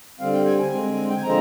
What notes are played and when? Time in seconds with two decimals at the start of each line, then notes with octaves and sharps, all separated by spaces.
0.20 D3 G3 C4 F5
0.33 G5
0.46 G#5
0.59 G#5
0.71 D3 G#3 C4
1.09 G5
1.16 G#5
1.23 D3 F3 G#3 C4 A#5